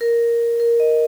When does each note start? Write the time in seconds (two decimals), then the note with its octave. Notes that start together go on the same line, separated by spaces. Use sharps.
0.01 A#4
0.60 A#4
0.80 D#5